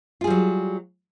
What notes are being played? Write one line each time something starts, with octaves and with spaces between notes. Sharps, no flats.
F#3 G3 F4 G#4